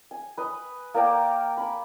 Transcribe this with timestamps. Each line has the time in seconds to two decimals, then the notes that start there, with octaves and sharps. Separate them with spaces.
0.11 G#5
0.38 B4 D#5
0.94 A#3 A#4 D5 G5
1.57 G#5 B5